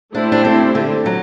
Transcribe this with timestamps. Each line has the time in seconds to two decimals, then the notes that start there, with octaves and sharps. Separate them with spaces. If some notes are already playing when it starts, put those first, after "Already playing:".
0.14 A3 D4 E4 G4 C5
0.32 D4
0.45 C4
0.75 D3
1.06 F#3